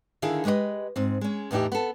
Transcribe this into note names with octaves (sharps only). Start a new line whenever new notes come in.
D3 D#3 E4 G#4 F5
G#3 G4 B4 C#5 D#5
G#2 C4
G#3 C#4
E2 A2 E3 D#4 G4
B3 A4